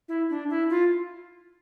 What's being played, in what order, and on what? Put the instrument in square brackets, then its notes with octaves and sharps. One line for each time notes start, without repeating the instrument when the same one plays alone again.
[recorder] E4
D4
E4
F4